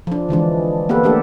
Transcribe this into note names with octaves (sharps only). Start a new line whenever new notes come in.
F3 D4
D3 E3 G#3 D4
A#3 B3 G4 A4 B4
A3 B3 D4 G4 A4